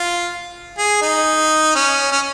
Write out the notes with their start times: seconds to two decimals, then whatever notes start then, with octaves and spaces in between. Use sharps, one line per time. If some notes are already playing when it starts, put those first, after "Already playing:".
Already playing: F4
0.78 G#4
1.02 D#4
1.75 C#4
2.12 C#4